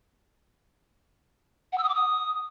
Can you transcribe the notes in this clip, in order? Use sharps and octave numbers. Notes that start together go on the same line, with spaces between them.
F#5
E6
D#6
D6
D#6